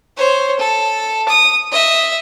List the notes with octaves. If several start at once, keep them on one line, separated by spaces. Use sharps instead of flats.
C5 C#5
A4
D#6
D#5 E5